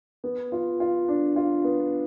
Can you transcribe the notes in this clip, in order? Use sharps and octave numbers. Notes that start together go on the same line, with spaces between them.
B3
F4
F4
D4
F4
B3